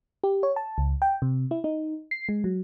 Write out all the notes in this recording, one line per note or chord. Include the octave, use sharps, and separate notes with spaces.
G4
C#5
A5
C#2
G5
C3
E4
D#4
C7
G#3
F#3